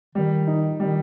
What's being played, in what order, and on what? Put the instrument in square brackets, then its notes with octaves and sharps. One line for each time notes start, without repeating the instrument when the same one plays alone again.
[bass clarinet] D#3 [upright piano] G3
[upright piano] D#4
[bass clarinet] D#3 [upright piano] G3